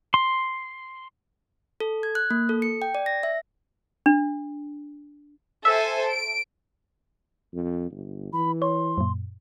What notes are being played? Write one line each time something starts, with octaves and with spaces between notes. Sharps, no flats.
C6
A4
G#6
F#6
A#3
A4
C#7
G5
D5
A#6
E5
D4
A4 C5 E5 G#5
D7
F2
G1
E3 B5
C#5 C6
F#2 A#2